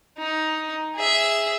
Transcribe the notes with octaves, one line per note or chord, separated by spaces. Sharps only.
D#4
G#4 E5